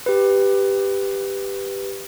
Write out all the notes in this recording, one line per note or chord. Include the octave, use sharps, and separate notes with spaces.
G4 B4